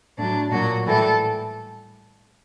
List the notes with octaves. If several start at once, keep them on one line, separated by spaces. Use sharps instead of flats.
A2 F#3 D4
A#2 F#3 F#4
A2 E3 G3 A4